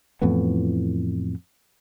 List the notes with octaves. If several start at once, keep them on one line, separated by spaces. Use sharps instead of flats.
F2 A2 E3 B3